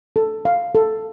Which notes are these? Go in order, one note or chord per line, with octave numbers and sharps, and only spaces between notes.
A4
F5
A4